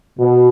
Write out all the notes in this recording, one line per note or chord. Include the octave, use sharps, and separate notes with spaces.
B2